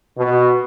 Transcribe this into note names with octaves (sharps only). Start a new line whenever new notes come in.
B2